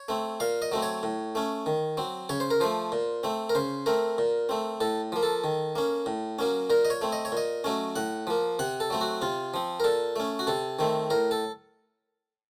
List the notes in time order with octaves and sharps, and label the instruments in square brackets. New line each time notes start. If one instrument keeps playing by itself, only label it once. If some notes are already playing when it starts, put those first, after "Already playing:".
Already playing: [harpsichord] C#5
A3 C4
A#2 F5
D#5
F#3 A3 C4
C#5
A2
A3 C#4
D#3
F#3 C4
C#3 C#5
C5
A#4
F3 A3 C5
A#2
A3 C4
A#4
C#3 C5
A3 C4 A#4
A#2
A3 C4
A2 A4
F3 A#3
A4
D#3
A#3 C#4
A2
F#3 A#3 C#4
A#2 A#4
D#5
C#5
A3 C4
D#5
C#5
A#2 D#5
F#3 A3 C#4
A2 F#5
F3 A#3
C3 F#5
A4
F#3 A3 C4
F#4
C3 F4
F3 C4
A#4
A#2 A4
A3 C#4
F#4
C3 A4
D#3 A3 C4
A2 A#4
A4